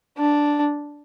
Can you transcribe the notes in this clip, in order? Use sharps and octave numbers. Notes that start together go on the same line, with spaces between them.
D4